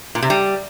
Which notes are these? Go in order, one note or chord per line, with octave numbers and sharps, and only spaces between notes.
A#2
C3
G3